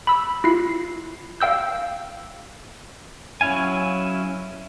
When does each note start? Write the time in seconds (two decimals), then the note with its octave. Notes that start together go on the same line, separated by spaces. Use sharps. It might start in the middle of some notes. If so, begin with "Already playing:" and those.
0.07 B5 E6
0.44 E4 F4 C7
1.40 F5 G5 E6 G6
3.41 F#3 C#4 E4 F5 G#5